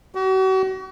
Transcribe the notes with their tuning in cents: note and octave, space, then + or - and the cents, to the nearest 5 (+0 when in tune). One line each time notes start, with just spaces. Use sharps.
F#4 +40